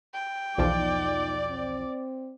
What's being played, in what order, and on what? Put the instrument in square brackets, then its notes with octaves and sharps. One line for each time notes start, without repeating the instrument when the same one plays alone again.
[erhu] G5
[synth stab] B1 E2 F3 [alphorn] D#4 [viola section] D5
[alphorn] C4